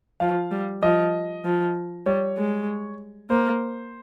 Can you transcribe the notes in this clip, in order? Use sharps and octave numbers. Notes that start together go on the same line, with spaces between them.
F3 F5
G3
F3 D#5
F3
G3 C#5
G#3
A#3 C5